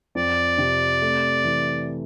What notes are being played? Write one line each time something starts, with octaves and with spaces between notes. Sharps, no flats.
F2 D5
C3
A3
E3